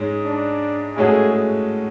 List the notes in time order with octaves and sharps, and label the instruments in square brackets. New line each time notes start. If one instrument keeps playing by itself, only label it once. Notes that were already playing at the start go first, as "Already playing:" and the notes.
Already playing: [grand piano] G#2 G#3 C#4
[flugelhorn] D4
[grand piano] A2 G#3 C#4 F#4 A4 [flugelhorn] G#4